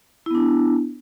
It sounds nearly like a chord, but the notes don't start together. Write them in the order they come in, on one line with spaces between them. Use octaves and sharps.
E4 B3 D4